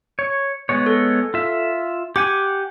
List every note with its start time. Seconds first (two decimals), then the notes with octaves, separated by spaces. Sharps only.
0.19 C#5
0.69 G#3 B3 C#5
0.86 A4
1.34 F4 E5
2.16 G4 F#5 G#5 D6